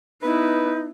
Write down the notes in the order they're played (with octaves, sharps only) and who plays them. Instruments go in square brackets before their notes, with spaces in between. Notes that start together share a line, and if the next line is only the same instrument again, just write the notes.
[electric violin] B3 E4 [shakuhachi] D#4 [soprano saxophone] B4